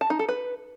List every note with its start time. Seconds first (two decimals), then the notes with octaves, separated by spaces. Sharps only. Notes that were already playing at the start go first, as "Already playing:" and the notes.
0.01 A5
0.10 D#4
0.19 A4
0.29 B4